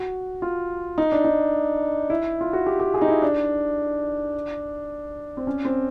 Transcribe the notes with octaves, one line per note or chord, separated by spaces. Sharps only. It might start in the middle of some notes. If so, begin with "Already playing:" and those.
Already playing: F#4
F4
D#4
D4
D#4
E4
F4
F#4
G4
G4
G#4
D#4
E4
D4
C4
C#4
C4